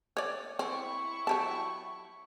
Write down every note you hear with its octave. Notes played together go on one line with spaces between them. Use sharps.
C#5 D5
C4 E4 C#6
F#3 G4 A5